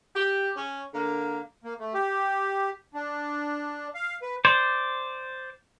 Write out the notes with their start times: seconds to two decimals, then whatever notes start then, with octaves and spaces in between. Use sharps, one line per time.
0.15 G4
0.56 C#4
0.94 D3 A#3
1.64 A#3
1.80 A3
1.94 G4
2.94 D4
3.94 F5
4.22 B4
4.45 C5 D5